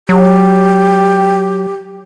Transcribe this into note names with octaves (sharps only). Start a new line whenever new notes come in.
F#3 G4